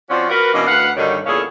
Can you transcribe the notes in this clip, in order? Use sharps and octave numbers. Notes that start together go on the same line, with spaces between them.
F3 C4 C#4 F#4 C5 D5
F#4 A#4 B4
B2 E3 A#3 C#4 D4 D#5
D2 B4 F5 F#5
G2 D3 D#3 D#4 F#4 C#5
E2 A#2 C#4 G#4 A4 F5